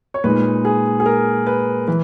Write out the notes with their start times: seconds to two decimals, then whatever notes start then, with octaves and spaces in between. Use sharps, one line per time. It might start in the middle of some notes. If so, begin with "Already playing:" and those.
0.14 C#5
0.24 A#2 G#3 D#4 B4
0.65 G#4
1.00 G#4
1.06 A#4
1.47 B4
1.88 E3 B4